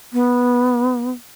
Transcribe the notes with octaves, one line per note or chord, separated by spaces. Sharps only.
B3